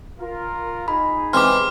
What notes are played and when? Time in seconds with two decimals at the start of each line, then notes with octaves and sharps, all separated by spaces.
0.20 F4 A#4
0.88 D#4 G#4 B5
1.33 C3 E3 G#3 C6 D6 F6